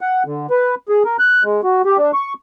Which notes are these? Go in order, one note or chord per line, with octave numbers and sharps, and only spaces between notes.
F#5
D3
B4
G#4
A#4
F#6
G#3
F#4
G4
D4
C#6